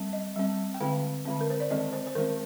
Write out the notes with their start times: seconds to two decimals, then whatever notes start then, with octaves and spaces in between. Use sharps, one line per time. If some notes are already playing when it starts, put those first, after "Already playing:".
Already playing: G3 C4
0.13 D#5
0.36 G3 C4
0.74 G5
0.81 D3 G#3 C4 F5
1.25 D3 G#3 C4
1.41 A#4
1.50 C5
1.60 D5
1.71 D#3 G#3 C4 D#5
1.93 C5
2.06 C5
2.15 D#3 G#3 C4 A#4